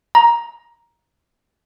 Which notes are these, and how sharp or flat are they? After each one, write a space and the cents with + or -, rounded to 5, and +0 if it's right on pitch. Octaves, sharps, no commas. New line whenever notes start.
A#5 +10